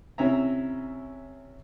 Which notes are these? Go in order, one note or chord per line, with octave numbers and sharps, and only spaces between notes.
C3 C#4 E4 E5 A#5